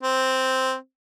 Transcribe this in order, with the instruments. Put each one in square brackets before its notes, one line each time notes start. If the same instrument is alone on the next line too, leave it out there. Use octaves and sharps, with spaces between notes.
[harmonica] C4